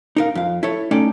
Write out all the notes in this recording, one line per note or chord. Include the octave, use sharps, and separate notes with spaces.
D#4 A#4 F5
F2 F5
E4 A4 C#5
A3 C#4 D#4 A4 D5 G5